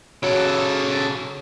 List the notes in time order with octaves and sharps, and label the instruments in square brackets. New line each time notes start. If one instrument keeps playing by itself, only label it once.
[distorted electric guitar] C#3 A4 [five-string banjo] F#3